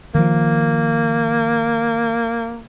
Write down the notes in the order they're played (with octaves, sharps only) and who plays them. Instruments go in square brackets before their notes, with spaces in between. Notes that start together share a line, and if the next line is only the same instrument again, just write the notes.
[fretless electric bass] D#3 F3 [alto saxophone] A#3